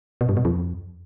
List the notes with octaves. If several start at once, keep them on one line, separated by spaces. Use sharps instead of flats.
B2
G2
B2
F2